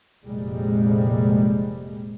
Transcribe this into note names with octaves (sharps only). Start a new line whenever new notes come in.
F1 A#2 G3 G#3